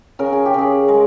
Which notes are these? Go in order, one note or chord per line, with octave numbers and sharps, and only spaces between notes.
C#3 A#4
G#4
G4
C#3 G#4
G#3 A#4